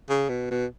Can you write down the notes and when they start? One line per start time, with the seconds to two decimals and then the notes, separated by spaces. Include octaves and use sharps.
0.09 C#3
0.29 B2
0.51 B2